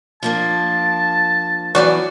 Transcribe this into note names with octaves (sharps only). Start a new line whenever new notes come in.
F3 A#3 D4 A5
E3 F#3 B3 F#4 D5